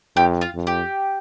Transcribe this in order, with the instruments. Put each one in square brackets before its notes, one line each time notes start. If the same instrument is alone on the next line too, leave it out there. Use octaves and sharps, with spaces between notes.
[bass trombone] F2 [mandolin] G4
[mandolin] F4
[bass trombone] F2
[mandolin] G4